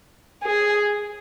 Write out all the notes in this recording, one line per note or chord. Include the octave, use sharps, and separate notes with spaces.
G#4